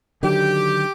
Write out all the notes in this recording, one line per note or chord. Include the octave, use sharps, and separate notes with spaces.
D3 D#3 F#3 G4